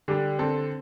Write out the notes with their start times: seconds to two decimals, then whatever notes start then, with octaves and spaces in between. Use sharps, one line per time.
0.08 D3 G3 D4 G4
0.39 D3 C4 A4